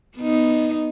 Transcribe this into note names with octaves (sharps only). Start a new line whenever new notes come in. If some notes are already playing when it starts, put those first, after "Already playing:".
B3 D#4